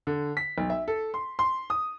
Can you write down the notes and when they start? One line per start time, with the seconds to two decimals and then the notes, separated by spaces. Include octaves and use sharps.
0.07 D3
0.37 B6
0.58 B1
0.70 E5
0.88 A4
1.14 C6
1.39 C6
1.70 D#6